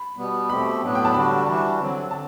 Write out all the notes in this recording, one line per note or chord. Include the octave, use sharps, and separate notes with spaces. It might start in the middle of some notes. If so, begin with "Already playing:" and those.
Already playing: B5
B2 G3 B3
B2 A3 C4 G4 B5
A2 F#3 B3 D4
G5
A5
D3 G3 D4 F#4 B5
E3 G3 D4 F#4 A5
D3 F#3 C4
D3 A5